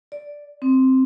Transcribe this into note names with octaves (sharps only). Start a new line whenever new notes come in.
D5
C4